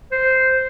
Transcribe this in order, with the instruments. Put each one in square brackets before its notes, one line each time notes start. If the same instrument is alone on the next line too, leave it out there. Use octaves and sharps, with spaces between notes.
[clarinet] C5